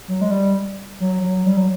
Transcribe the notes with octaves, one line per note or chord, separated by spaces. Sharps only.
F#3
G#3
G3
F#3
F#3
G3
F#3